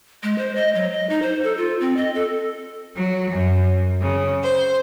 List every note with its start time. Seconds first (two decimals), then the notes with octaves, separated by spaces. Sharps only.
0.23 G#3
0.38 C5
0.55 D#5
0.75 F#3
0.93 D#5
1.09 D#4
1.22 C5
1.43 A4
1.57 F4
1.80 C4
1.97 D#5
2.15 A4
2.96 F#3
3.30 F#2
4.00 C#3
4.44 C5